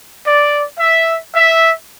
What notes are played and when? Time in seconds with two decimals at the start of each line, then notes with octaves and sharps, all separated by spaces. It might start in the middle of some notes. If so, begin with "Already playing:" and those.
0.25 D5
0.78 E5
1.33 E5